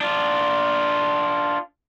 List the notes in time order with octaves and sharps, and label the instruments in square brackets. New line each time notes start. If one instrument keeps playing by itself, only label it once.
[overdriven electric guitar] D4 F4